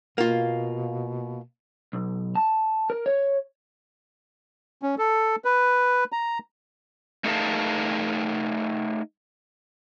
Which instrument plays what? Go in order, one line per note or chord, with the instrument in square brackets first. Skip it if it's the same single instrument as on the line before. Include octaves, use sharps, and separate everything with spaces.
[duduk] B2 [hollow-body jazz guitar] A#3 F4
[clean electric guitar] B1
A5
A#4
C#5
[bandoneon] C#4
A4
B4
A#5
[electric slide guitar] A3 D#4 G#4 A#4 F5 A5